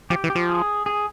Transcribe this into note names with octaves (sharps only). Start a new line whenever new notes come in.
F3 G4
E3
G4
F3
G#4
G#4